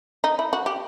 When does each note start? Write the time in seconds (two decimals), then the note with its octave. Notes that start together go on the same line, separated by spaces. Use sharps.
0.24 D#4
0.39 E4
0.53 F#4
0.66 G4